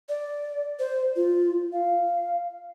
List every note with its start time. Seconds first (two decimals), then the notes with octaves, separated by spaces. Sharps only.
0.09 D5
0.79 C5
1.16 F4
1.73 F5